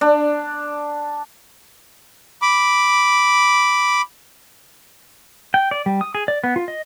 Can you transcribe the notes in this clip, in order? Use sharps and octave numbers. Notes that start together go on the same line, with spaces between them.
D4
B5 D6
G5
D5
G3
D#6
G#4
D5
B3
F4
D#5